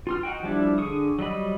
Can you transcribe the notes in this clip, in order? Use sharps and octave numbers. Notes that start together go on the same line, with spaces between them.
F4 C6 F6
D#4 F#4 G5
F3 G3 D4 E4
D3 G#4 C#6 D#6
F#3 G3 D#5 B5